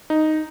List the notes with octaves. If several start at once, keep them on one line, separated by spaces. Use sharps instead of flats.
D#4